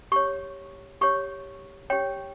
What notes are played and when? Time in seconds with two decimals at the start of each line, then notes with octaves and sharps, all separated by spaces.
0.12 G4 C#5 C#6
1.01 G4 C#5 C#6
1.90 G4 C#5 G5